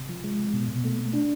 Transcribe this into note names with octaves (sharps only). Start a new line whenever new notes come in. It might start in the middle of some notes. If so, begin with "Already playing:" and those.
Already playing: C3
F3
G#3
C3
B2
B2
A3
A3
D4